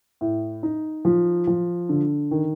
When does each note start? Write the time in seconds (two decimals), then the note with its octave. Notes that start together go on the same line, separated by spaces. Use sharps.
0.21 A2
0.63 D#4
1.05 F3
1.47 F3
1.89 D3
2.31 D#3